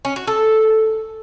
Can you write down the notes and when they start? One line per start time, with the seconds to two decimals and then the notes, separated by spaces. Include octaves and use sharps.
0.05 C#4
0.16 F#4
0.27 A4